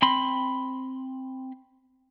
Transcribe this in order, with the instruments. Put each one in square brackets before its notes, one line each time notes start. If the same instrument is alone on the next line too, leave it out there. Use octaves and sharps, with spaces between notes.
[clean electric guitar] C4 B5 C6